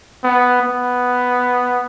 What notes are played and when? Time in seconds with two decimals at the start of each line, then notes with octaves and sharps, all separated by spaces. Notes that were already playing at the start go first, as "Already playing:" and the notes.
0.24 B3
0.62 B3